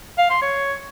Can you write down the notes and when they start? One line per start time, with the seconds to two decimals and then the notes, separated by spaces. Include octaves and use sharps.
0.18 F5
0.30 C6
0.42 C#5